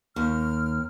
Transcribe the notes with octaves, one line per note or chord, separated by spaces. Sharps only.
D#2 D#3 F6